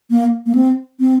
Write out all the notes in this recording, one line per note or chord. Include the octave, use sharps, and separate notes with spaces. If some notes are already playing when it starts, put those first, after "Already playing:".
A#3
A#3
C4
C4